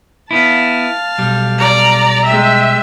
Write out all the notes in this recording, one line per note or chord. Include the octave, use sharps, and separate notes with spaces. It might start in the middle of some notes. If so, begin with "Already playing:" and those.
B3 E4 F5 A5
B1 G3
D5 A#5
G#3 E5 G5